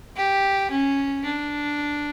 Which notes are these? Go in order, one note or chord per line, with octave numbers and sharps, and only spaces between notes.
G4
C#4
D4